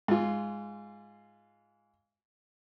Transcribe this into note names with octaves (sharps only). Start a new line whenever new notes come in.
G#2 F4